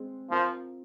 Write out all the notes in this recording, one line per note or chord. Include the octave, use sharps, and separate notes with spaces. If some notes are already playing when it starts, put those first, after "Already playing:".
Already playing: G#3 C4
F3 C4 F4 A#4